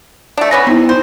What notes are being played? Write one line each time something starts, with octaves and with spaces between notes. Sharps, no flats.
A3 D4
B3 C#4 B4 A#6
C3 B3 D#4 E4
C5